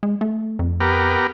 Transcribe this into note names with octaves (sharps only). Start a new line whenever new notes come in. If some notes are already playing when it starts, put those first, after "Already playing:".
G#3
A3
F2
B3 G4 A#4